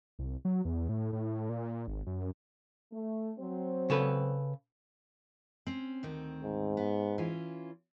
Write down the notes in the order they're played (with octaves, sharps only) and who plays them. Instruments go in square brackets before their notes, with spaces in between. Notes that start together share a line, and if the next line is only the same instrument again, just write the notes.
[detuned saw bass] C2
F#3
E2
A2
A2
A#2
G#1
F#2
[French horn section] A3
F#3 C4 C5
[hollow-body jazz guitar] C#3 A4 B4
[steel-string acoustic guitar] C4 C#4
D2 D#3 C4
[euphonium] G#2
[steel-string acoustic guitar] B3
E3 C#4 F4